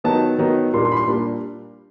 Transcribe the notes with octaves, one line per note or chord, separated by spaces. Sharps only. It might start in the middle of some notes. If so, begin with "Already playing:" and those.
D#3 F#3 B3 D#4 A5
D#3 F#3 B3 D#4
A#2 G3 A#3 D4 C6
C6
B5
C6
A#2 G3 A#3 D4